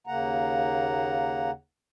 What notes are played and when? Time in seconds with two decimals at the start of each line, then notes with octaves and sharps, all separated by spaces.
0.07 D#2 C#3 A#3 F#5 A#5